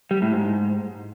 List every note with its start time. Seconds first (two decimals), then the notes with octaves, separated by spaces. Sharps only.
0.11 G3
0.22 A2
0.33 G#2